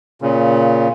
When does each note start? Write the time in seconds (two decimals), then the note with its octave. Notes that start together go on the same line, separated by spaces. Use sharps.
0.22 A#2 C#3